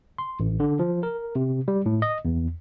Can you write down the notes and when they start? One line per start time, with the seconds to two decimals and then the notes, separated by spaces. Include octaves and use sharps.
0.18 C6
0.40 A1
0.60 D3
0.79 F3
1.03 A#4
1.35 C3
1.68 G3
1.86 A2
2.02 D#5
2.25 E2